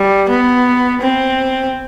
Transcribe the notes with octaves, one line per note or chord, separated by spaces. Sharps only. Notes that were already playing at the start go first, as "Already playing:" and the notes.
Already playing: G3
B3
C4